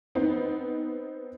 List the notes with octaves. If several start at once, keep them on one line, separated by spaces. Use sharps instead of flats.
B3 C4 D#4